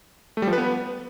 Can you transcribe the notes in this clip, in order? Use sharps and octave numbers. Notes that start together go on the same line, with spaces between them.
A3
G3
F3
B4
B3